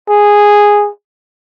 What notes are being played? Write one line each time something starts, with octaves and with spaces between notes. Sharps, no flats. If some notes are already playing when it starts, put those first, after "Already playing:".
G#4